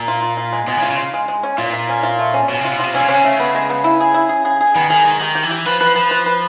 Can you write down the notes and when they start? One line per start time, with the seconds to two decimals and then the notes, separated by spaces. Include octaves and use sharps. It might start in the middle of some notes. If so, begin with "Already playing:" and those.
Already playing: A#2
0.08 F4
0.22 F4
0.37 F4
0.53 G#3
0.67 B2 G#3
0.78 C#3
0.82 F4
0.90 C#3
0.97 F4
1.14 G#3
1.28 G#3
1.43 C#4
1.58 A#2 F4
1.73 F4
1.89 C#4
2.03 F4
2.19 A3
2.34 C#4
2.48 B2 C#4
2.60 C3 F4
2.72 B2
2.80 C3 F4
2.94 D3 C#4
3.01 C#3
3.09 C3 C#4
3.15 C#3
3.24 A3
3.40 B3
3.55 G#3
3.70 B3
3.84 E4
4.00 G#4
4.14 E4
4.29 G#4
4.45 G#4
4.61 G#4
4.75 D#3 B3
4.90 D#3 G#4
5.05 D#3 G#3
5.20 D#3 G4
5.35 G4
5.43 E3
5.51 G4
5.65 F3 B4
5.81 F3 B4
5.96 F3 B4
6.11 B4
6.26 B4